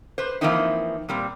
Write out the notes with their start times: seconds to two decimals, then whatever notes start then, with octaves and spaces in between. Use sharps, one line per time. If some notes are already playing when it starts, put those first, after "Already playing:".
0.18 B4 C5
0.41 E3 F3 A#3 C4 D#4 E4
1.09 A#2 G3 C4